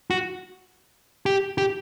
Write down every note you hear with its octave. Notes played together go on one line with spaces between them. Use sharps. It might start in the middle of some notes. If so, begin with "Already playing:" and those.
F#4
G4
G4